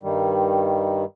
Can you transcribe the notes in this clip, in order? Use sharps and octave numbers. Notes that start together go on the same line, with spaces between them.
G2 D#3 G3